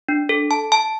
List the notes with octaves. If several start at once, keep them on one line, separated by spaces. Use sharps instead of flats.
D4
A4
A5
A5